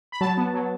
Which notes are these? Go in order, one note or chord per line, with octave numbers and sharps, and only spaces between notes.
B5
F#3 A5
B3
F#3